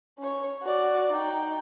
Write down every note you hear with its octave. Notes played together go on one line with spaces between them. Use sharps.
C#4 C#5
F#4 D5
D#4 G5